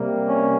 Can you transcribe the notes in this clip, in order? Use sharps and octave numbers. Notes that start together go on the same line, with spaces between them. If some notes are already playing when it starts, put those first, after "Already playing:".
Already playing: C3 G3 A#3
C#4